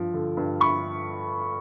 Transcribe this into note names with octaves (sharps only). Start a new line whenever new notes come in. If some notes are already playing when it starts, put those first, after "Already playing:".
Already playing: G2 F3
D3
G2
B5 C#6